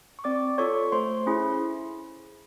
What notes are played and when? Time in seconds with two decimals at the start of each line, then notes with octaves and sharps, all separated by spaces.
0.19 C#6
0.24 C4 D5 D6
0.58 F4 A4 C#5 C#6
0.92 A3 C5 C6
1.26 C#4 E4 G#4